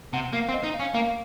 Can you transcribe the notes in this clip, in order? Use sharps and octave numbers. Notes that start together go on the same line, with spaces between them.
C3 F#5
A#3 F5
C4
D#5
D#4
F5
C#4
A#3 F5